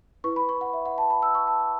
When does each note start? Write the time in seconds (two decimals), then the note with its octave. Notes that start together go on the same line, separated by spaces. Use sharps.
0.24 E4 B4 C#6
0.36 B5
0.49 C#6
0.61 F#5
0.74 E5
0.86 F#5
0.98 A5
1.10 B5
1.23 E6
1.35 C#6
1.47 A5
1.60 A5